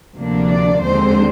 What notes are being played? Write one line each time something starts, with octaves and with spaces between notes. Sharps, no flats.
D2 C3 F3 A#3 D4
D5
D#2 D3 G#3 C4 C5